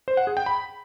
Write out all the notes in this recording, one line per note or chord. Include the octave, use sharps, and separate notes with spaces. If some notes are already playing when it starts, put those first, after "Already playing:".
C5
F#5
G#4
G5
B5